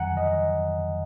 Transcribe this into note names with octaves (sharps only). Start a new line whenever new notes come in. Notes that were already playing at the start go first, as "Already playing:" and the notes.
Already playing: F2 D#3 F#3 F#5 G#5 A#5
D#5